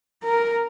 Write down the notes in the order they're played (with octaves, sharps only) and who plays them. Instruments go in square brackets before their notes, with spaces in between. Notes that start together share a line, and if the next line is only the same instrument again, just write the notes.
[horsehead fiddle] A#4